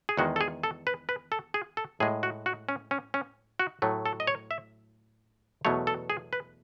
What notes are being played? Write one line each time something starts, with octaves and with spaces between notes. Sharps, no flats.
G#4
E2 D#3 G#3 F#4
A4
G#4
A4
B4
B4
A4
G#4
A4
A2 G#3 G#4
F#4
F#4
C#4
C#4
C#4
F#4
A2 F#3 A3
A4
D#5
C#5
E5
E2 B2 F#3 A3 C#5
A4
G#4
B4